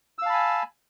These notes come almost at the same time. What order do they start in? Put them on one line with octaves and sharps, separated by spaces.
E6 F5 A5 B5 G#5